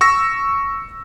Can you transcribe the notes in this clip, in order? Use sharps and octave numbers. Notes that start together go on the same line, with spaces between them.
C#6 E6 A#6